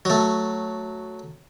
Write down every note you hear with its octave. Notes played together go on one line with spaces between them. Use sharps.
F#3 A3